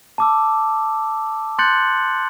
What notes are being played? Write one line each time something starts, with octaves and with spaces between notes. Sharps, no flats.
A5 D6 E6
C6 F#6 G6 A6 C#7 F#7